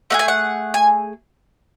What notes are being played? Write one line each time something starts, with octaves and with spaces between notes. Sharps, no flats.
A3 D#4 G#4 F#5
G#5
F#5
G#5